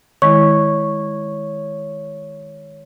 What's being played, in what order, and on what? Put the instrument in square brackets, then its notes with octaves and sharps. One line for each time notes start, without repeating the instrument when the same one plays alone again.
[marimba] D#3 G#3 E4 [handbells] C#5 [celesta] C#6